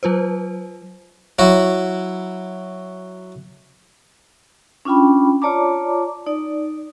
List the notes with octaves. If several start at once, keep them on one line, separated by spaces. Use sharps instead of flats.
F#3 F4 B4 C5
F#3 E4 F#4
C#4 D4 F4 G5 B5
F4 C#5 D5 A5 A#5 D6
D#4 D5